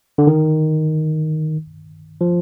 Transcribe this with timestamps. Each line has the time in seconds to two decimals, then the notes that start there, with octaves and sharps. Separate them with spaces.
0.18 D3
0.27 D#3
2.21 F3